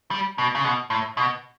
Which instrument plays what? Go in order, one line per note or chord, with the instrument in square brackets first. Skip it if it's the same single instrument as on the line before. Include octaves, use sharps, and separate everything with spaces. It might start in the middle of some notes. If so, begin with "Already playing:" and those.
[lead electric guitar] G3
B2
C#3
B2
A2
B2